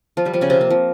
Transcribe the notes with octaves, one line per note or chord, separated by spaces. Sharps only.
F3 F4
G3 G4
F3 F4
C#3 C#4
C3 C4
A#3
F3